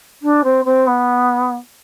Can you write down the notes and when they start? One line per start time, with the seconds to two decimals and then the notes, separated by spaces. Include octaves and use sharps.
0.22 D4
0.44 C4
0.65 C4
0.87 B3